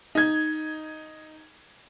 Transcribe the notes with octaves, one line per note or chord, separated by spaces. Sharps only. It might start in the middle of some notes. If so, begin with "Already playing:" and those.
D#4 G#6